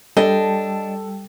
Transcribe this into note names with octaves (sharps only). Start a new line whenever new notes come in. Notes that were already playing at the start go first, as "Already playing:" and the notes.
G3 D4 A4 D#5 G5